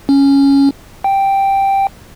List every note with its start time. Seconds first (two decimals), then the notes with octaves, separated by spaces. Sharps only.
0.09 C#4
1.04 G5